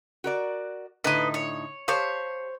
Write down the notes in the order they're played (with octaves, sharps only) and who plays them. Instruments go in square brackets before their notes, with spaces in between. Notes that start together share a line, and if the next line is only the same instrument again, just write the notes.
[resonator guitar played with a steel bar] F#4 A#4 D5
[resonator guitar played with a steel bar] A2 D3 D#4 [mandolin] B4 D#5
[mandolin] C#5
[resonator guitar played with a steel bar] G4 F5 A5 [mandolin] C5 C#5